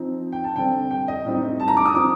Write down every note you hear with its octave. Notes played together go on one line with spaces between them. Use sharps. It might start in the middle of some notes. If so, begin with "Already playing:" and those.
Already playing: F3 C4 D#4
G5
A5
D3 G3 C4 G5
G5
D#5
A2 G3 C4 D#4
A5
A#5
D6
D#6
F3 C4 D#4 D6